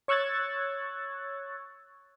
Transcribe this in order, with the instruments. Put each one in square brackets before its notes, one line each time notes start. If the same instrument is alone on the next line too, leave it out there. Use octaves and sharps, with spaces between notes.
[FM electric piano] C#5 C#6 E6 F#6 G#6 A6